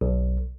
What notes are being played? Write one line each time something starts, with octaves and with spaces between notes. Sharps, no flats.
B1